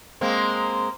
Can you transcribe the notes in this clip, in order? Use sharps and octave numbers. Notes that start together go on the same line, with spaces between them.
G#3 A#3 C4